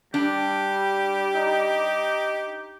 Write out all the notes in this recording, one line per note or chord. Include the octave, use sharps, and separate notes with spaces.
G3 D4 G4
D#4